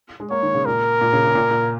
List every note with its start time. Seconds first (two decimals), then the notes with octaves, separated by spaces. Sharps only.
0.20 G#3
0.30 A#3 C#5
0.43 D#3
0.54 C#3
0.65 A#2 A#4
1.01 A#2
1.13 C#3
1.24 C#3
1.35 A#2
1.51 A#2